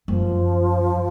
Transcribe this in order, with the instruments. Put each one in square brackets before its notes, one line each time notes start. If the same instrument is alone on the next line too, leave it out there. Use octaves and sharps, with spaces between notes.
[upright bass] F#2 [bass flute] F3